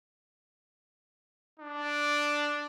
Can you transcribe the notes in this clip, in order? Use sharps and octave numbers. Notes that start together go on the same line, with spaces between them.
D4